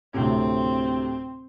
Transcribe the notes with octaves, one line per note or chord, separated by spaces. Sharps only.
D2 A2 C3 C4